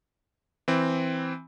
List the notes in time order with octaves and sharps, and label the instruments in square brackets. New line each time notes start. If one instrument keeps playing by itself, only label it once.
[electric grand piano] E3 C4